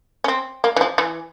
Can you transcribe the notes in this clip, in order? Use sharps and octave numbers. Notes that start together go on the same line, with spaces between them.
C#4
C4
A#3
E3
F3
E3